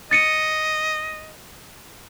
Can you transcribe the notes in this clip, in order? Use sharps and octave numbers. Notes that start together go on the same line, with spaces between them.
D#5 A6 C#7 D#7